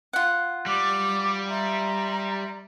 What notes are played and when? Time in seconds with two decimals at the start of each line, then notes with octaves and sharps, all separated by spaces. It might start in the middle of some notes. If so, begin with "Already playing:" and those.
0.13 F4 F#5
0.66 G3 D6
1.49 E5 A#5 C6